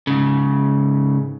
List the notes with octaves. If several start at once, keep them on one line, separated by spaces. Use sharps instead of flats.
G#2 C#3